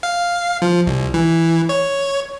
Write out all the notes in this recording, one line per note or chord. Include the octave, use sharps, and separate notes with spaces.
F5
F3
C2
E3
C#5